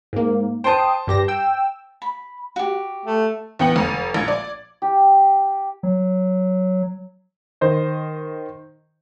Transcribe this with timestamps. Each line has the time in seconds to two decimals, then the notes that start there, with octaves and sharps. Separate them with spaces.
0.13 G#2 A#3
0.64 C5 G5 A5 C6 D#6
1.07 G2 G4 A#6
1.28 G5 E6
2.02 B5
2.56 F#4 G4
3.05 A3
3.59 E2 B3 G5 C#7 F#7
3.76 F1 A#5 D#7
4.14 A#1 G#6
4.28 D5
4.82 G4
5.83 F#3
7.61 D#3 C5 D#5